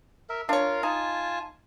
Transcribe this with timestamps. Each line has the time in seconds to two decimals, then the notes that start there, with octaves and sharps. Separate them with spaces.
0.30 A#4 E5
0.49 D4 F4 A#4 C#5 F5
0.83 D#4 F4 G#5 A5